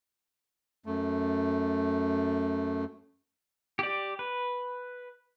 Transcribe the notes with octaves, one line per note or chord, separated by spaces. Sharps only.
F#2 A3
G4 D5
B4